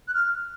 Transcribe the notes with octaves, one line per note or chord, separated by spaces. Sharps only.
F#6
F6